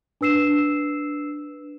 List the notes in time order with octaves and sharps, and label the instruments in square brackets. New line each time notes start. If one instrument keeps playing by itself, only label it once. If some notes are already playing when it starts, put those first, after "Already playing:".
[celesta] D4 B4 E6 C7 E7